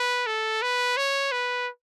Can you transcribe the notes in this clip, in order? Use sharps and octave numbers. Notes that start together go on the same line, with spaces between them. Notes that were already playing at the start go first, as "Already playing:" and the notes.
Already playing: B4
A4
B4
C#5
B4